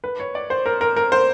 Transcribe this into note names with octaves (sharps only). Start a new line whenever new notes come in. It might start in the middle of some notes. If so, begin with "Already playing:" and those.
B4
C#5
D5
C5
A#4
A#4
A#4
C5